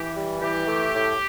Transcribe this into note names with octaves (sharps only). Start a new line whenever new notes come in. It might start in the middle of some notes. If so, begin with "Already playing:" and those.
Already playing: E3 G4
G3
E3 G4
A3
A2